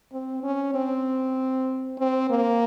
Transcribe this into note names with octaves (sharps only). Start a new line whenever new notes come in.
C4
C#4
C4
C4
A#3